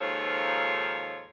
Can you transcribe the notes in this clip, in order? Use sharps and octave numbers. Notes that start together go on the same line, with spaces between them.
D#2 G#2 F3 F4 A4 C#5